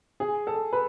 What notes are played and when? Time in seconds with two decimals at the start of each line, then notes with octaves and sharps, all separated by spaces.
0.20 G#4
0.47 A4
0.73 B4